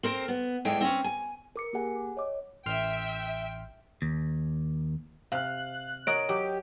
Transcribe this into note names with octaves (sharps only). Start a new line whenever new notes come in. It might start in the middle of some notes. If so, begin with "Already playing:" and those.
C4 A#4 C5
B3
E2 A2 E3 G#3 G5
C4 C#4
G#5
A#4 D6 C#7
A#3 G4 G#4 F#5 G#5
C#5 D#5 D6
A1 E5 G5 C6 F6
D#2
C3 F5 F6 F#6
F#4 A#4 C#5 D#5 D#6 D7
F#3 G4